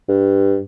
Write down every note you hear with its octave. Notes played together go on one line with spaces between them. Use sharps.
G2